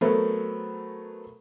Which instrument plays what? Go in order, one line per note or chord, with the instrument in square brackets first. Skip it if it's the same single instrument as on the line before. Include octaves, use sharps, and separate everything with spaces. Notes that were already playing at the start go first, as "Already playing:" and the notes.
[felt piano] F#3 A3 B3 C4 A4 A#4